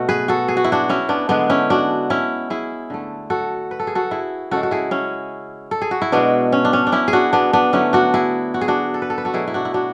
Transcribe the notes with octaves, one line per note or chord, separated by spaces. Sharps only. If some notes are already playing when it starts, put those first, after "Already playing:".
Already playing: B2 A3 F#4
G#4 B4
F#4 A4
G#4
F#4
E4
D4 F#4
C#4 E4
B3 D4
D3 G#3 B3 D4
C#4 E4
D4 F#4
C#4 E4
E4 G#4
D3 A3
F#4 A4
B4
A4
G#4
F#4 A4
E4 G#4
C#3 G#3 F#4 A4
F#4
E4 G#4
C#4 E4
A4
G#4
F#4
E4
B2 G#3 B3 D4
C#4
D4
C#4
D4
C#4 E4
G#4
D4 F#4
B3 D4
B3 D4
D3 F#3 A3 C#4 E4
D4 F#4
E4 G#4
F#4
G#4
D4 F#4
A4
B4
A4
B4
F#4 A4
B2 F#3 A3 E4 G#4
E4
D4 F#4
E4
D4 F#4